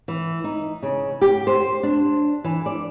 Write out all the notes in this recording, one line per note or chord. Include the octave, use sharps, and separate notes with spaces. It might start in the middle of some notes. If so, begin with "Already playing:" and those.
E3
D#4
C#3
G4
C5
D4
E3
D5